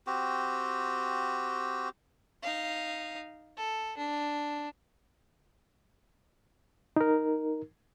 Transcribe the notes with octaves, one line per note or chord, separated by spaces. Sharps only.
C4 F#4 G4
D#4 F5
A4
D4
D#4 A#4